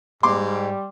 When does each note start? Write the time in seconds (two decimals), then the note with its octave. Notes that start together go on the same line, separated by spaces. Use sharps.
0.23 G#2 G3 C6 D6